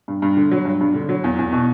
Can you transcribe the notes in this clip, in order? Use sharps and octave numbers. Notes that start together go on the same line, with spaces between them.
G2
G2
D3
F#3
G2
G2
D3
F#3
E2
E2
B2